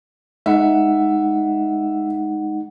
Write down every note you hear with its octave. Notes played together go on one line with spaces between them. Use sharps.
G#3 D#4 E5 F#5